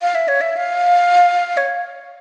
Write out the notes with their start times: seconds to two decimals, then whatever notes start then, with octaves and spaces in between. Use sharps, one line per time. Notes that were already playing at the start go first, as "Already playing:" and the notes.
0.02 F5
0.15 E5
0.28 C#5
0.41 E5
0.57 F5
1.57 C#5